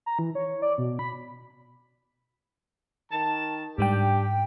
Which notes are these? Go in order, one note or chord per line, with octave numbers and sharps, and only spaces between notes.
A#5
E3
C#5
D5
B2
B5
D#3 A5
G#2 G3 D4 G4 G5